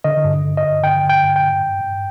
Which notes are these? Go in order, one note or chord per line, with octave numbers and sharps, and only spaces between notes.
D3 D#5
G2
D3
D#5
G2
D3 G5
D3
G5
G2
G5
G2
G2
G2